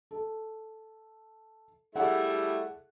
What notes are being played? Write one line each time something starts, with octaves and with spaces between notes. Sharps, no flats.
A4
G3 A3 E4 G#4 A4 F#5